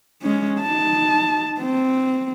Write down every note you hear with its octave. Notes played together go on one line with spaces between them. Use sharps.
G#3 C#4
D#4 A5
C4